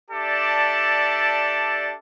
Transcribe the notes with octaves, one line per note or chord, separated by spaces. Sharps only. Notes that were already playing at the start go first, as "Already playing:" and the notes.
D4 G4 A4 D5 E5 A5